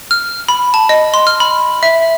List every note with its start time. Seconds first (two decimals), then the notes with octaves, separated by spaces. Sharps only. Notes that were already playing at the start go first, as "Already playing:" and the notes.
0.11 F6
0.48 B5
0.74 A5
0.89 D#5
1.14 C6
1.27 F6
1.40 B5
1.83 E5